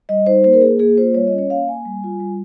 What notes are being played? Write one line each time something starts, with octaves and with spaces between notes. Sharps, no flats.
G3 D#5
D#4 C5
A#3 C5
A#4
A#3 G#4
A#3 G#4
F4 C5
G3 C#5
D#5
C#4
C#5
A#3 F5
A#3 G#5
G3
F4
G3